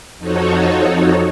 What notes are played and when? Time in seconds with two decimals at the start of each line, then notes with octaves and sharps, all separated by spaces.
0.18 F2 F3 D#4 F#4 A4 C#5